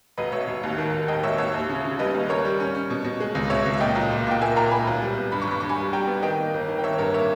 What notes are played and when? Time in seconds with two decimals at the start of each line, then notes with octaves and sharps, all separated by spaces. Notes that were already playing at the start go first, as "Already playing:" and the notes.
0.17 E1 B4 D#5
0.32 E1 C#5 E5
0.48 E1
0.63 D#2
0.78 D#3
0.93 E1
1.08 E1 D#5 G5
1.23 E1 C#5 E5
1.38 D#2 C#5 E5
1.54 D#2
1.69 C#3
1.84 C#3
1.99 G3 B4 D#5
2.14 D#2
2.29 G3 A#4 C#5
2.45 G3
2.60 C#4
2.75 C#4
2.90 B2
3.04 B2
3.20 G#3
3.35 C#2
3.50 B2 C#5 E5
3.66 C#2
3.73 E5
3.80 A#2 D#5 G5
3.95 B1
4.12 A#2
4.27 A#2 G5
4.41 A#3 E5 G#5
4.56 A#2 G5 A#5
4.71 A#3 G#5 B5
4.87 B1
5.02 G3
5.18 B3
5.32 G2 B5
5.42 C#6
5.47 G2 B5
5.60 G2 C#6
5.69 G#5 B5
5.77 G3
5.93 G3 G5 A#5
6.07 B3
6.22 D#3 D#5 G5
6.38 A#3
6.54 G1
6.68 D#3
6.79 G5
6.83 G1 C#5 E5
6.98 G2 A#4 C#5
7.14 A#3 C#5 E5